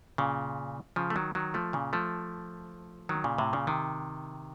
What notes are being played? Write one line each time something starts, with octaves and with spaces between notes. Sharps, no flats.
A#2 C#3
C#3 F3
A3
D#3 F#3
D#3 F#3
F3 A3
A#2 C#3
F3 A3
D#3 F#3
A#2 C#3
A2 C3
A#2 C#3
C3 D#3